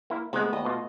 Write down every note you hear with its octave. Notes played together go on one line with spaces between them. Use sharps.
A#3 E4
C3 G#3 A3 B3
D#2 D#5
B2 F4